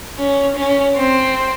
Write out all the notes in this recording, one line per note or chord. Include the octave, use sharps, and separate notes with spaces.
C#4
C#4
C4